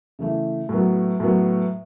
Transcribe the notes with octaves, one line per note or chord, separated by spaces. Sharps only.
C#3 E3 A3 E4
A2 F#3 B3
A2 F#3 B3